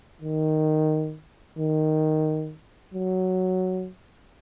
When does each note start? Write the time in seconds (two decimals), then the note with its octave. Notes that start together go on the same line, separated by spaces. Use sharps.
0.22 D#3
1.59 D#3
2.94 F#3